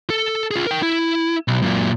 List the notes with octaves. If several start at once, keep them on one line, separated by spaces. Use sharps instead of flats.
A4
F4 G#4
A#4 G5
E4
B1
F#2 A#2